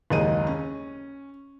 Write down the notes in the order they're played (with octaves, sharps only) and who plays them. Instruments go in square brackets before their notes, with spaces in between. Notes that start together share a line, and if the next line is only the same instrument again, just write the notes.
[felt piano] F#1 D#2 G#3 D#4 D#7
C#4